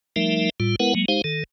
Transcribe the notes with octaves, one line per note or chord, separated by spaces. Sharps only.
F3 G3 A3 D#4 A#4 E5
A2 G3 F4
G#3 B3 E4 A#4 B4 F#5
F#3 G#3 A#3
G#3 D#4 G4 C5 F5
D#3 A4